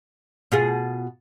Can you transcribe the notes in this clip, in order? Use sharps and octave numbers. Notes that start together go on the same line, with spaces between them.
B2 F4 G#4